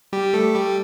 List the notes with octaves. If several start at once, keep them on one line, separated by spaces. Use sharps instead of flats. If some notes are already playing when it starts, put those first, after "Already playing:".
G3 G4
A3 A4
G3 G4